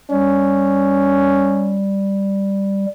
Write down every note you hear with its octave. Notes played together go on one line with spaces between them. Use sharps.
G3 C#4